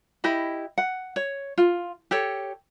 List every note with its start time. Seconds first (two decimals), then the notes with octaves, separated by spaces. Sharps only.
0.24 E4 G4 D#5 B5
0.78 F#5
1.16 C#5
1.58 F4
2.11 G4 A4 C#5